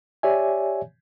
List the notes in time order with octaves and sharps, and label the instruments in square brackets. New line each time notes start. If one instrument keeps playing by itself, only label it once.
[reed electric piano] G4 C#5 D5 E5 G#5